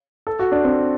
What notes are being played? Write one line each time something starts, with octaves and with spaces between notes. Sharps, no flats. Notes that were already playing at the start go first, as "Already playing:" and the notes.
A4
F#4
D4
C4